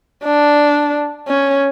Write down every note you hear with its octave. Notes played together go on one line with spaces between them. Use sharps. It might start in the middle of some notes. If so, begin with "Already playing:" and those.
D4
C#4